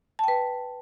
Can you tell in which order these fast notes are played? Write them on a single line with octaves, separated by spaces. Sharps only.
A5 G5 B4